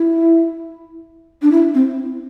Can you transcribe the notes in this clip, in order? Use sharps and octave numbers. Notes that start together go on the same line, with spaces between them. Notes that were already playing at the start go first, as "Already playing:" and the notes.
Already playing: E4
D4
E4
C4